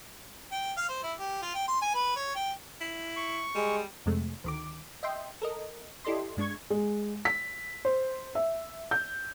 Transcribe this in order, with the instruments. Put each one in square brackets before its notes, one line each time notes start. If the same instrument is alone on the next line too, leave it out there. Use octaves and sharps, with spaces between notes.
[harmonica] G5
F5
C5
E4
G4
F4
G5
C6
G#5
B4
C#5
G5
[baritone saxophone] E4
[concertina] C#6
[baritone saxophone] G3 [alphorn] G#3
[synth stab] F2 C3 G#3 A3
D2 D#3 D6
D#5 E5 G5 C6
A4 A#4 D#5
E4 G4 A4 D5 D#5 C6
G2 G#3 D4 C#6 G#6
[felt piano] G#3
B6
C5
E5
G6